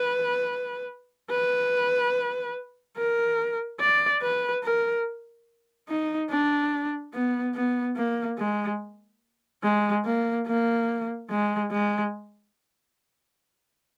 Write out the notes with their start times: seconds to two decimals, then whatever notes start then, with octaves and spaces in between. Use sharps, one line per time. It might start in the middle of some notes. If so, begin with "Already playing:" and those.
Already playing: B4
1.31 B4
2.97 A#4
3.80 D5
4.23 B4
4.64 A#4
5.89 D#4
6.30 D4
7.14 B3
7.55 B3
7.96 A#3
8.38 G#3
9.63 G#3
10.05 A#3
10.47 A#3
11.30 G#3
11.72 G#3